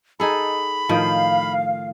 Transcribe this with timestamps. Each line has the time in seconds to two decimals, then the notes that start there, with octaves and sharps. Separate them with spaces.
0.20 D#4 G#4 A4 B5
0.89 A2 D#3 F3 F5